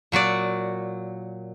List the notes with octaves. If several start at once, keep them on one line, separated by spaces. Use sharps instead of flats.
A#2 F#3 F#4 D5